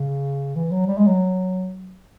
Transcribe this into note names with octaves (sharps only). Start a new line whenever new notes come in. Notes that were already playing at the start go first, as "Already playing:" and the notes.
Already playing: C#3
E3
F#3
G3
G#3
F#3